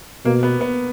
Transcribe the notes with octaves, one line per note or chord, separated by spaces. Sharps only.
B2 A#3
B3
B3